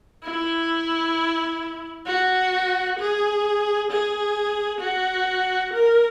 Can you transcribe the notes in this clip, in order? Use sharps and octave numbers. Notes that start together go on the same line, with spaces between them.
E4
F#4
G#4
G#4
F#4
A#4